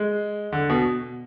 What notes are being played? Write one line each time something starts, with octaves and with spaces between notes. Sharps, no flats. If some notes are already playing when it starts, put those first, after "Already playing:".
Already playing: G#3
D3
B2